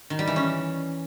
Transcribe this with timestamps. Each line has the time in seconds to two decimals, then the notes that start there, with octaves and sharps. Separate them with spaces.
0.10 D#3
0.19 G3
0.27 E3
0.36 C#4